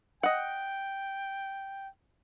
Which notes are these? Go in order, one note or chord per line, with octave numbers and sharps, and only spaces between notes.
D#5 F#5 G5